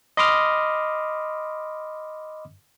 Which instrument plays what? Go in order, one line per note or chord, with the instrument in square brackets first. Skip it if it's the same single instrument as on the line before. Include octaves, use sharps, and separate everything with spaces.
[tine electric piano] D#5 B5 C6 D6 D#6 F6